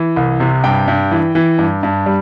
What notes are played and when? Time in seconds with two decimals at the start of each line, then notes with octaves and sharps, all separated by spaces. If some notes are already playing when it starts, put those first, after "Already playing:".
Already playing: E3
0.16 C2
0.40 C3
0.64 G2 G5
0.88 G2
1.11 E3
1.35 E3
1.59 G2
1.83 G2
2.06 G3